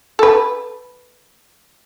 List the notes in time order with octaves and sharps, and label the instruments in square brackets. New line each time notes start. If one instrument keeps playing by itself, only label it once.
[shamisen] A4 B4